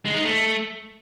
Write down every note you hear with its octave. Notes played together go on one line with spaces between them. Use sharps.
G#3
D#4
A3